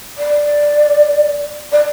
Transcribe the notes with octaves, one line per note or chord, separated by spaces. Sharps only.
D5
D5